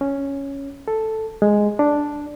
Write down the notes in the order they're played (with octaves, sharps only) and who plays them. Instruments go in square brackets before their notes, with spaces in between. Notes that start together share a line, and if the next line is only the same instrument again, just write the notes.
[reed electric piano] C#4
A4
G#3
D4